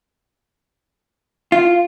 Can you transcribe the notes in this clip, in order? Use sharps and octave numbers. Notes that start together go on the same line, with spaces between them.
F4